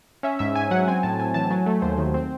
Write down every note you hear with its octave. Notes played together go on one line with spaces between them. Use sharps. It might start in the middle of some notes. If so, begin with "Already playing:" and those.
C#4 E5
G#2 E5
G#2 G#5
F#3 F#5
C4 G#5
A2 A5
A2 G#5
E3 A5
F#3 G#5
A3
D#2 C5
D#3
C4 C5